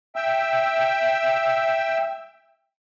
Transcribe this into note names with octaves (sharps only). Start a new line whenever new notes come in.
E5 G5 E6